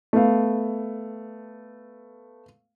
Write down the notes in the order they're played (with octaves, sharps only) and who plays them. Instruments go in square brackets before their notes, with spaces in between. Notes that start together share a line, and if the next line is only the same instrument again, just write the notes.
[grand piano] A3 B3 F5